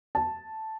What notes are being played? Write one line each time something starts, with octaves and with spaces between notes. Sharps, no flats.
A5